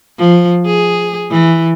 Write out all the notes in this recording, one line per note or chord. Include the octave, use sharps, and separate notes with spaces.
F3
G#4
E3